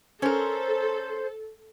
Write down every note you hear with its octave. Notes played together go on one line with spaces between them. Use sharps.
C#4 A4 A#4 C5